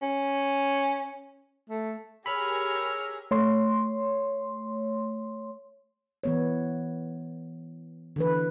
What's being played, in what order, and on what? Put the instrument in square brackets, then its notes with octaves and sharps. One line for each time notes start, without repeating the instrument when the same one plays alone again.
[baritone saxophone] C#4
A3
[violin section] G4 G#4 A#4 [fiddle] C#5 F6 [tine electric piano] B5 [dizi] E6
[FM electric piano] A3 C#5 C6
[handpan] E3 B3 C#5
D3 E3 B4